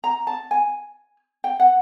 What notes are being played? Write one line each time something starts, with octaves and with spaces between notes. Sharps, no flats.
A#5
A5
G#5
G5
F#5